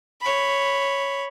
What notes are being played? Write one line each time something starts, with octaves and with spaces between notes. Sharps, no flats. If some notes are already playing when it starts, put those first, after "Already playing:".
C#5 B5